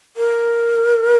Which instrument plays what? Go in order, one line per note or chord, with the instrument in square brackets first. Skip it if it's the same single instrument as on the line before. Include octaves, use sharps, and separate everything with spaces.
[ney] A#4